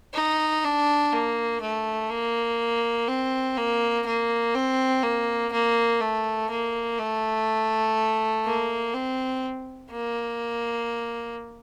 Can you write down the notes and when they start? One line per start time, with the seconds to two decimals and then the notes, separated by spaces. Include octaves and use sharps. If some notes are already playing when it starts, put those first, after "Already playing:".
0.14 D#4
0.64 D4
1.13 A#3
1.61 A3
2.10 A#3
3.08 C4
3.57 A#3
4.06 A#3
4.55 C4
5.03 A#3
5.52 A#3
6.00 A3
6.50 A#3
6.99 A3
8.46 A#3
8.94 C4
9.91 A#3